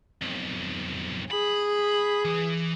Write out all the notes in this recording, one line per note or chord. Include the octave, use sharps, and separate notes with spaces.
B1 F2
G#4 B5
E3